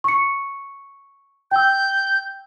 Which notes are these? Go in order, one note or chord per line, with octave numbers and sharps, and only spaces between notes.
C#6 C#7
G5 E6 G6